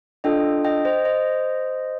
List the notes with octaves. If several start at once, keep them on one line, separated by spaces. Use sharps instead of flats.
D4 F4 A4 D#5 G5
D#5 G5
C5 D#5
C5 D#5